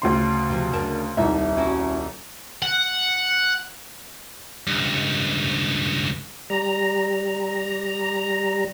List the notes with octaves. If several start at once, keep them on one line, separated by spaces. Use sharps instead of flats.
D2 C#3 C6
C3 F3
D3 A#4 A5
D#1 C2 D#4 E5
C#4 E4 F#4
F#5
C#2 G2
G3 A#5